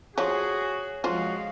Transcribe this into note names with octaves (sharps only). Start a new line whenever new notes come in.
F3 F#4 G#4 C#5
F3 G#3 F4 F#4 C5 F5